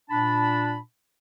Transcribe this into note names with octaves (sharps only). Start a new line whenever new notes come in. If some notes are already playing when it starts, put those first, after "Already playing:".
A#2 D4 A5 B5